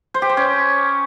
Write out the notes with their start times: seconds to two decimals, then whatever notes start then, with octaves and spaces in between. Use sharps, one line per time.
0.14 C5
0.22 G4
0.29 C5
0.37 C#4